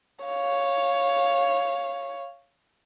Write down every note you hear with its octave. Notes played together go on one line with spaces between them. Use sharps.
C#5 F5